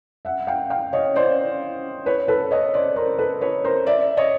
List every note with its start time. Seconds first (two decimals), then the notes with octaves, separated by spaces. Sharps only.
0.25 E5 F#5
0.47 F5 G5
0.70 F5 G5
0.93 C#5 D#5
1.15 C5 D5
2.06 B4 C#5
2.28 A4 B4
2.51 C#5 D#5
2.74 C5 D5
2.96 A#4 C5
3.19 A4 B4
3.41 B4 C#5
3.64 A#4 C5
3.86 D5 E5
4.17 C#5 D#5